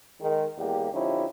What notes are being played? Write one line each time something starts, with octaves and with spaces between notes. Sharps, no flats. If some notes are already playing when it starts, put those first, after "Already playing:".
D#3 G#3
E2 G#3 A#3 G4
D3 F3 C#4 D#4 E4 G4